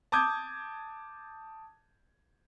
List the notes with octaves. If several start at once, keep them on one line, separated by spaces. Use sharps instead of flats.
A5 D6 D#6 G6 G#6